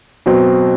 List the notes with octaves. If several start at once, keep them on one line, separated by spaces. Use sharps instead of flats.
B2 F#3 C4